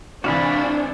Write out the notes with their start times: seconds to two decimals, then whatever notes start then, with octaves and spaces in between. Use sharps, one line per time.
0.24 G#1 C3 E3 D4 F#4 F5 B5